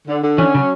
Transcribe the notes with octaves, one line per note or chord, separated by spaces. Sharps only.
D3
D3
E3 C#4
C#3 F#3